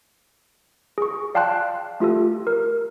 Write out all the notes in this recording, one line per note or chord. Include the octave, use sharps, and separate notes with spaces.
G#4 C#6
D5 F5 G5 A5 C6 F#6
A3 F4 G4 A4
A#4